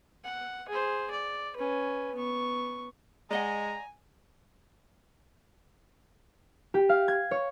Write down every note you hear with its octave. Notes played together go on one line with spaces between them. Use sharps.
F#5
G#4 C5
D5
C#4 B4
B3 C#6
G#3 D5 D#5 F#5 G#5 A#5
G4
F5
G#6
C#5